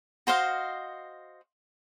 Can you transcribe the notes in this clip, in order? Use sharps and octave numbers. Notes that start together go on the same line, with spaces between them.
F#4 C5 D#5 F5